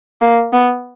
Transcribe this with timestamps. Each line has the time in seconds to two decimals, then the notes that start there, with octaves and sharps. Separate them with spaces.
0.21 A#3
0.53 B3